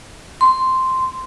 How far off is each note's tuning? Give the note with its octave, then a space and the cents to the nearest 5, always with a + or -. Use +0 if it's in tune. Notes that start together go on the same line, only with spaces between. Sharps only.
C6 -5